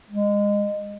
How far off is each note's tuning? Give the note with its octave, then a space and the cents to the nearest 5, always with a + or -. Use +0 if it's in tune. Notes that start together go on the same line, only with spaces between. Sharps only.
G#3 -20